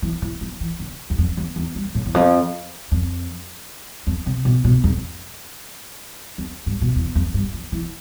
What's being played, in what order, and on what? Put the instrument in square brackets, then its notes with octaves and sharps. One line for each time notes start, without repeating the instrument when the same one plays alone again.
[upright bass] E3
E3
F3
E3
D3
E2
F2
E2
E2
G2
A2
E2
F2
F2
F2
C3
B2
B2
F2
F2
G2
B2
E2
F2
G2
F3
E3